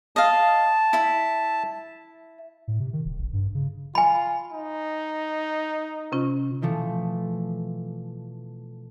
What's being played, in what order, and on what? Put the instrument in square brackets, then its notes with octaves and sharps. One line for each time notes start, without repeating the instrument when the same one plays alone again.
[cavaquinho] D#5 F5 [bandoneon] A5
[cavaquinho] E4 E5
[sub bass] A2
C3
D#3
D#1
A1
G2
C#3
[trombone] F4 [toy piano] G#5 B5
[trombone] D#4
[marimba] C3 C#4 F4
[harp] B2 E3 F3 A3